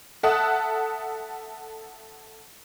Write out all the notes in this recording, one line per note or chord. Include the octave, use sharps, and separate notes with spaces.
A4 E5 F#5 A5 D#6 F#6